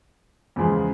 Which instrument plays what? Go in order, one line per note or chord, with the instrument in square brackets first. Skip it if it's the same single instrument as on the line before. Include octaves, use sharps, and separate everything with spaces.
[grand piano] E2 C#3 F3 G#3